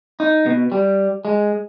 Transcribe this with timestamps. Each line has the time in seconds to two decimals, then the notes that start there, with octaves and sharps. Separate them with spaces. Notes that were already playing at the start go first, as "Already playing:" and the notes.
0.20 D#4
0.46 B2
0.72 G3
1.25 G#3